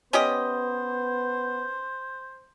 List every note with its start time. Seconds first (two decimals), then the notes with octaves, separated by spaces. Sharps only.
0.13 B3 C#4 G4 C5 D#5